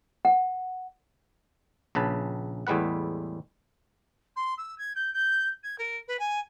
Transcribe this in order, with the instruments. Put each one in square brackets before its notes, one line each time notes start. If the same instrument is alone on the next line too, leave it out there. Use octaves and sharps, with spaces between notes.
[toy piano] F#5
[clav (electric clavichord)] A#1 C#3 B4 A5
E2 A2 G3 G#3 B4 F#5
[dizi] C6
E6
G#6
G6
G6
G#6
A#4
B4
G#5